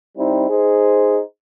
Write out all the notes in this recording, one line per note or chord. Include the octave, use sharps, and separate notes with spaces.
G3 C4 D#4 E4
D#4 G#4 C5